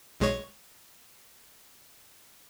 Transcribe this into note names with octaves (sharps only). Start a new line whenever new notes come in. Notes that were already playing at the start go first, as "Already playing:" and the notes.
B1 G#3 C#5